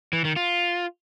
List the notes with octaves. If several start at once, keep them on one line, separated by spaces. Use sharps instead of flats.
E3
D#3
F4